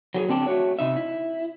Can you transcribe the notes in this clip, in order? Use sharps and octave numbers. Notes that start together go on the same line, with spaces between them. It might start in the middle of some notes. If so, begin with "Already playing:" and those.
F#3 G4 G#4
D3 C4 D4 G5
A3 F#4 C#5
C3 D#4 E5
E4